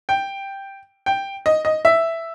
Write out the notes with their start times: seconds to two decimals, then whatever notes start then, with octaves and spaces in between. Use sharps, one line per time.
0.09 G5
1.06 G5
1.46 D#5
1.65 D#5
1.85 E5